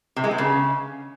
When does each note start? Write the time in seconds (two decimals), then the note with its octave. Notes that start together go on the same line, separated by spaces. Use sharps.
0.16 C3
0.24 G#3
0.31 B3
0.38 C#3